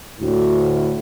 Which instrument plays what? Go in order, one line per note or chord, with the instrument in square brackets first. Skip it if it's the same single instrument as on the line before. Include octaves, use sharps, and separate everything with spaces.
[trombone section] D2 A2